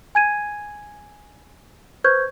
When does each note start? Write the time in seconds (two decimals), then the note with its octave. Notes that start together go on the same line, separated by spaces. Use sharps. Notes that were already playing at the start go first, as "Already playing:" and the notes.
0.15 G#5 G#6 D#7
2.04 B4 C5 C#6 G6 G#6